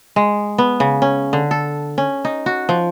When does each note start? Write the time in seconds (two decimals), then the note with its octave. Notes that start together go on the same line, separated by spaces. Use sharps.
0.16 G#3
0.58 B3
0.80 C#3
1.02 C#4
1.33 D3
1.51 A4
1.98 C#4
2.25 D#4
2.46 F#4
2.69 F3